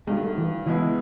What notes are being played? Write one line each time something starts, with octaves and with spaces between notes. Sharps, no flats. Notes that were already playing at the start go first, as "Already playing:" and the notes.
G2 D#3 F#3 G#3
A3
E3
C#2 B2 E3 G#3 B3 E4